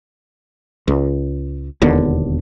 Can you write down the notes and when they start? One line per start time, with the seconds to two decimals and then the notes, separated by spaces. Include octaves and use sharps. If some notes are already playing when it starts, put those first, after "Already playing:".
0.88 C#2
1.82 E1 D#2 D3 B3